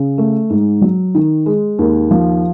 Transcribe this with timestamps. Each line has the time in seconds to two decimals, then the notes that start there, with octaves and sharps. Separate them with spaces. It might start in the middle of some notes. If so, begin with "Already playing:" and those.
Already playing: C#3
0.18 A3
0.50 G#2
0.81 F#3
1.15 D#3
1.46 G#3
1.78 D#2
2.11 F3